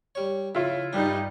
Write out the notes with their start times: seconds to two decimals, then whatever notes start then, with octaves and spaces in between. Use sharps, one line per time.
0.15 G3 C#5
0.55 C#3 E4 F4
0.93 G2 G3 D4 D#4